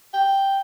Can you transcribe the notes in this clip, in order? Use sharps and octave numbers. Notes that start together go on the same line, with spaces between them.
G5